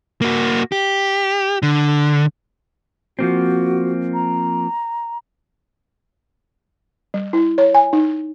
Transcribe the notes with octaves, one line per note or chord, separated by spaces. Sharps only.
A#3 F#4
G4
D3
F3 A#3 C4 F#4
A#5
G3
E4
C#5
G#5
D#4